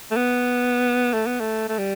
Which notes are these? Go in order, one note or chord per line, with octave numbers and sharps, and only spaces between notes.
A3
B3
A3
B3
A3
A3
G3